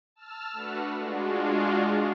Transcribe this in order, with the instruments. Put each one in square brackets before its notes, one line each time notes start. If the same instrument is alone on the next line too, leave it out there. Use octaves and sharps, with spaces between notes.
[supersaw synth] A5 E6 F6
A3 D4 F#4 B4 F#5
G#3 D4 F4 F#4